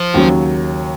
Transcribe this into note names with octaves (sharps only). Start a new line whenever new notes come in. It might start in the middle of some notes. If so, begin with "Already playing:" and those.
Already playing: F3
D#2 C#3 F#3